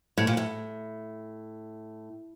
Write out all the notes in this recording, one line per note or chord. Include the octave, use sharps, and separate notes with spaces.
A2
A#2
A2